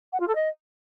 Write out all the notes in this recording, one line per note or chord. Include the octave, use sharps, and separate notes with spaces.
F#5
F4
A4
D#5